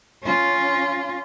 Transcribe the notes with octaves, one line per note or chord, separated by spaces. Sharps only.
C#4 F4